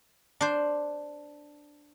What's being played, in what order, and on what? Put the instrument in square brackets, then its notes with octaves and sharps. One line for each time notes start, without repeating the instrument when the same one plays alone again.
[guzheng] D4 C5